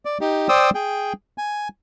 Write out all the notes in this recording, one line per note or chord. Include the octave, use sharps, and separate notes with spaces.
D5
D#4 G4
C5 D5 G5 D#6 E6
G#4 G5
G#5